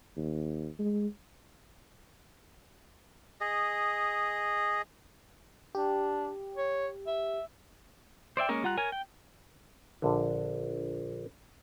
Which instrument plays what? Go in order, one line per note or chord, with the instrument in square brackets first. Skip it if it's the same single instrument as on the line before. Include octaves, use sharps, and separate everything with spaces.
[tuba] D#2
G#3
[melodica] G#4 D#5
[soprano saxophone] D4 [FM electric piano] G4
[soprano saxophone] C#5
E5
[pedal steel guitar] C5 D5 E5 G5
G#3 A#3 C#4 A#4 C#5
G3 F4 F#5 A#5 F#6
A#4 C#5 G#5 A#5
G5
[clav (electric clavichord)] A#1 D3